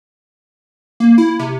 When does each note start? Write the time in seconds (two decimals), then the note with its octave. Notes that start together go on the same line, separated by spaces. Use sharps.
1.00 A#3
1.18 E4
1.39 C3